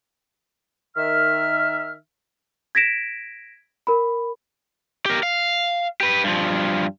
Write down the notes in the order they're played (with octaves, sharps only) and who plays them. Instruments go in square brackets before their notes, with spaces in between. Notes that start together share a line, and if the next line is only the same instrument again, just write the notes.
[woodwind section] D#3 E5 F6
[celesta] G#6 A#6 B6 D7 E7
A#4 B5
[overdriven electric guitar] G4 A#4
F5
G4 B4
G2 F3